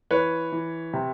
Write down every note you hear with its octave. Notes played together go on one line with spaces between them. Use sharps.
E3 B4 C#5
E3
C3